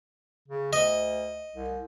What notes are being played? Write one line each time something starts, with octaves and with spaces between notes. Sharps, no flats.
C#3
D2 D#5
C2